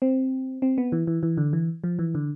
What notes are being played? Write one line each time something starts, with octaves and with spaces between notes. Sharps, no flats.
C4
C4
B3
E3
E3
E3
D3
E3
F3
E3
D3